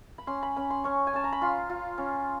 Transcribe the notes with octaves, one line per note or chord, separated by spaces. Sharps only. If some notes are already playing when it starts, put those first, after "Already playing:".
B5
C#4 C6
B5
C#4 B5
C6
C#4 C#6
G#5
C#4 A5
A#5
B5
F4 C6
F4
C#4